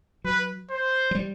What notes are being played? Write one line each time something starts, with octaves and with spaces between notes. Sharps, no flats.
F#3 B4
C5
F#3
G3